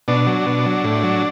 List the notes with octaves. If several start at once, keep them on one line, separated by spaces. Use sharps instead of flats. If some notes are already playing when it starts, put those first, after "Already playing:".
B2 D4
F#3
B2
F#3
A2
F#3